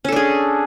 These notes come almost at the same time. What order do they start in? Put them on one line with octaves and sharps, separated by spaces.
C#4 A4 D4 G#4